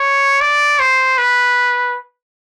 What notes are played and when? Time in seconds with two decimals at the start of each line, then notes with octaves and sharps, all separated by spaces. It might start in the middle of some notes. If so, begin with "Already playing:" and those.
Already playing: C#5
0.41 D5
0.79 C5
1.18 B4